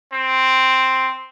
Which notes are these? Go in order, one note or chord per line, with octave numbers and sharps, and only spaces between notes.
C4